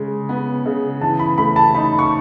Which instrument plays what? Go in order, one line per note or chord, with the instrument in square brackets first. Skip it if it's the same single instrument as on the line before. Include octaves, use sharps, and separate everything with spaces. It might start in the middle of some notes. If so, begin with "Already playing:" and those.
Already playing: [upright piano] C#3 G#3
B3
C#3
[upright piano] E3 [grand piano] A5
[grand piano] B5
[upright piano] A3 [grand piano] B5
[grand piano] A5
[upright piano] D#4 [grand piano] B5
[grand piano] C#6